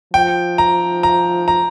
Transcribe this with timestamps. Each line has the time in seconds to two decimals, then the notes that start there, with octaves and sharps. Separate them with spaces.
0.14 F3 G5
0.58 A#5
1.03 A#5
1.48 A#5